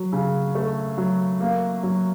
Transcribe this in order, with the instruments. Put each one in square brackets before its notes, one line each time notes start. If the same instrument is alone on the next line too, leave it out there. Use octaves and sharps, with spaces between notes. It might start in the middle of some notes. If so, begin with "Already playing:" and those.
Already playing: [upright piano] F#3
C#3
A3
F#3
A#3
F#3